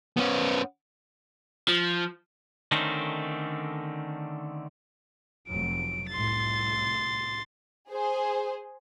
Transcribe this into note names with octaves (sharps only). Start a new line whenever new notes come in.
B3 C#4
F3
D3 D#3 A3 C4 C#4 D#4
F1 F#3 D7
C2 A2 C6 A6
G#4 C5